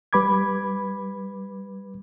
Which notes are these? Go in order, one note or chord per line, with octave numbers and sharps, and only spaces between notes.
G3 B4 B5 D6 G#6